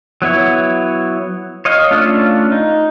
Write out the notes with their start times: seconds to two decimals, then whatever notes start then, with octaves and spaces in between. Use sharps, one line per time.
0.22 F#3 B3 E4 C#5
1.65 C#5 D#5 F5
1.91 A3 C#4 D4 F4
2.52 D#4